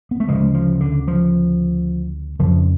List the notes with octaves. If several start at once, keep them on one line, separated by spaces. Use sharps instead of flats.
B3
A3
D2 C#3 F3 G#3
F3
D3
F3
F2 C#3 F3